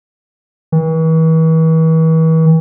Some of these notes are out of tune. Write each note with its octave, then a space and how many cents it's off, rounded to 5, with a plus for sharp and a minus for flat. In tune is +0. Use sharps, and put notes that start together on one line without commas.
E3 -40